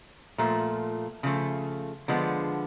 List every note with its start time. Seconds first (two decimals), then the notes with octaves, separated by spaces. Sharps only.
0.38 A#2 F3 A3
1.23 C#3 F3 A3
2.08 D3 F3 G#3 B3